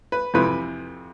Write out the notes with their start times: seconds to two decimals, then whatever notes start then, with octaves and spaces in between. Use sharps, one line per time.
0.12 B4
0.34 F2 C3 E3 B4